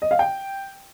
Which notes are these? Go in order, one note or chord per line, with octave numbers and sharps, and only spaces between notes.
D#5
F5
G5